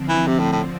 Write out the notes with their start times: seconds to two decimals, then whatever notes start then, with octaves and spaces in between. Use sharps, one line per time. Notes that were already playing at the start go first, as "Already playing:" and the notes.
Already playing: D3 F3 C4
0.09 E3
0.27 C3
0.39 A2
0.52 A2